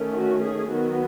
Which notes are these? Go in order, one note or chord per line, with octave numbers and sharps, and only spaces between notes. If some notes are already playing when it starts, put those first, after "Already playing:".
Already playing: D#3 A3 C#4
F#4
G#4
D#3 F#3 B3 F#4